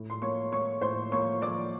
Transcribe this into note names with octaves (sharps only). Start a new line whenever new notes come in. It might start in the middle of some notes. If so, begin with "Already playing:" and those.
Already playing: A2
C6
A#3 C#5 C#6
A#3 C#5 C#6
A2 C5 C6
A#3 C#5 C#6
F3 D5 D6